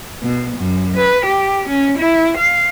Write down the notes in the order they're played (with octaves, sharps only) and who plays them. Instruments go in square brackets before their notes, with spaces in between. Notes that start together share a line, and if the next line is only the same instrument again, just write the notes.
[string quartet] B2
F#2
B4
G4
C#4
E4
F5